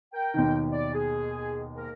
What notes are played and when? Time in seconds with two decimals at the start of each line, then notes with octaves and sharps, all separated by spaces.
0.13 A#4 G5
0.34 D#2 B2 D#3
0.72 D5
0.94 G#4
1.75 G#2 A#3 A#4